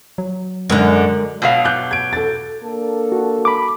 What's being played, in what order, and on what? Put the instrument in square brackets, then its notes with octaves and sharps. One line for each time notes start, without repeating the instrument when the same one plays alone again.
[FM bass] F#3
[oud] F#2 D3 [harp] G#3 A#4
[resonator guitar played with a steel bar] B2 F#3 F5
[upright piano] D6 F#6 G6
G#6 D7
A4 A6
[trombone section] A#3 D4 A4
[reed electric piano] F#4
B5 D6